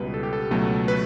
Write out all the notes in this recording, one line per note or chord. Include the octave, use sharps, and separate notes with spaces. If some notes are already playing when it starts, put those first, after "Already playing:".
Already playing: C#2 B2 G3 B4
A4
G4
A4
C#2 B2 F#3 A3
B4